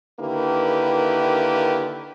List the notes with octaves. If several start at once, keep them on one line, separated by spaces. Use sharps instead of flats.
D3 D#3 A#3 E4 G4 B4